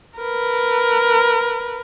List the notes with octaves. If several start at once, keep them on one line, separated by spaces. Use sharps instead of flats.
A#4 B4